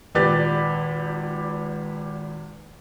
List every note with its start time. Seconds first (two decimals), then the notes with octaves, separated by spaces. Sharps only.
0.15 G#1 A#2 G4 B4 D5 A6